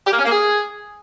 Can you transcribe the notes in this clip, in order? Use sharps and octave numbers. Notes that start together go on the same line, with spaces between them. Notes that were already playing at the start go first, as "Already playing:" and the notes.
G4
A#3
C#4
A#3
G#4